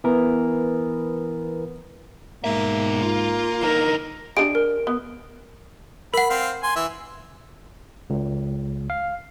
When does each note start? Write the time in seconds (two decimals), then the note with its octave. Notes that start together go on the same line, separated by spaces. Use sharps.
0.04 E3 B3 A#4
2.44 G#2 B2 A#3 E5
3.02 F4
3.62 D3 D#4 A#4
4.37 D4 G4 G#4 D7
4.55 A#4
4.87 B3
6.14 A#4 F#5 B5
6.30 C4 F5
6.63 G#5 C6
6.76 E3 E5
8.10 C#2
8.90 F5